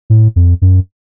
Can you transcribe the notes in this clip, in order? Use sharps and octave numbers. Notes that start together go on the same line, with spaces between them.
A2
F2
F#2